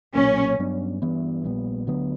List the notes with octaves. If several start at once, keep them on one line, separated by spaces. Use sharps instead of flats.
B1 A#2 F#3 A#3 C#4
G2 F#3 B3 D4
G2 E3 B3
A#1 A#2 G3 B3
D2 D3 F#3 B3